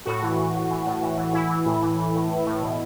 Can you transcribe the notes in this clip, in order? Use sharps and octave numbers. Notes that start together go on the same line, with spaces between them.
A2 F#4
E3
E3
A2
E3
A2
E3
E3
E3 E4
E3
A2
E3
E3
A2
A2
A2
B2